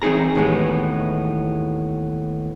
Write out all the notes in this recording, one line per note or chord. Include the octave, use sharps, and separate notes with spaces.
E3 C4 D#4 G#4 A#5
D#2 A2 E3 G#3 B3